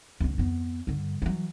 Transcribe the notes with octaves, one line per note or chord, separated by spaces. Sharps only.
D2 C#4
F2 B3
G2 D3
E3 F#3